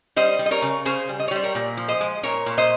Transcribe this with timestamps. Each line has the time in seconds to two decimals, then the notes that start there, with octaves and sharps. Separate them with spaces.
0.16 G3 C5 D#5
0.39 G3
0.46 D#5
0.51 A#4 C#5
0.62 C#3
0.85 C#3 G#4 C5
1.09 G3
1.20 D#5
1.28 C#5
1.31 G3 C5
1.43 A#4 C#5
1.55 A#2
1.77 F3
1.88 C5 D#5
2.00 G#3
2.23 A#2 A#4 C#5
2.46 A#2
2.58 C5 D#5